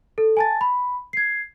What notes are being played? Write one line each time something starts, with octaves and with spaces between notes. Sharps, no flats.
A4
G#5 A5 A6
B5
G#6 C7